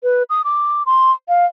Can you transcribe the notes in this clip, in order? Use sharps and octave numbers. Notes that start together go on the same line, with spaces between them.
B4
D#6
D6
C6
F5